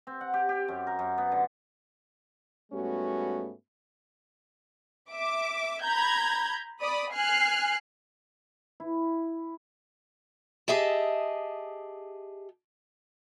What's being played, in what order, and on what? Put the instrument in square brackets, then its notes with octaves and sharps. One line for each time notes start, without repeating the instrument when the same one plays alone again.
[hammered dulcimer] C4
F#5
G4
G4
F#2
A#4
F#2
B3
D3
[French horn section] G#2 G3 A3 B3 C#4 F#4
[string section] E5 D6
A#5 B5 G6 G#6
D5 B5 D#6
G#5 F6 F#6 C7
[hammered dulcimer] E4
[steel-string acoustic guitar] G4 G#4 D#5 E5 A5